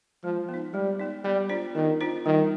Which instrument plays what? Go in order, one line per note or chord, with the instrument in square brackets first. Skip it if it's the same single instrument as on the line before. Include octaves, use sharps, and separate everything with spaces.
[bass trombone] F3 [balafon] G#3
[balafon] B3
D#4
[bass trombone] G3 [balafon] G#3
[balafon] B3 D#4
[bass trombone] G3 [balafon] B3
[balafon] D4 F4 C5
[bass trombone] D#3 [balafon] B3
[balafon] D4 F4 C5
[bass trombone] D#3 [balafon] G3